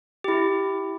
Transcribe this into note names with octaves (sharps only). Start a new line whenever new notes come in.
E4 G4